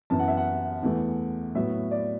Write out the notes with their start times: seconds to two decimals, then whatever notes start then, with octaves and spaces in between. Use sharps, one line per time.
0.10 F#2 E3 B3 A5
0.19 F#5
0.28 E5
0.37 F#5
0.82 E2 E3 A3
1.55 A2 F#3 B3 E5
1.91 D5